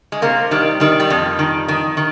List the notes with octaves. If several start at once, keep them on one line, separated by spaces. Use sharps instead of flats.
G#3
C3 A#3
D#3 G3
D#3 G3
G3
F2
D#3
D#3
D#3